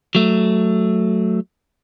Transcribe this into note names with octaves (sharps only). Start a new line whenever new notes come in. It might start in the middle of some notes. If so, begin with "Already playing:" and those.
F#3 A3